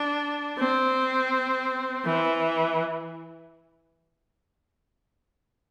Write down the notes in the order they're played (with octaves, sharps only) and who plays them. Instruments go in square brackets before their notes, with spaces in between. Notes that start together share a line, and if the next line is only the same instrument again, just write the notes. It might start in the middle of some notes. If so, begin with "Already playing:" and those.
Already playing: [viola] D4
C4
E3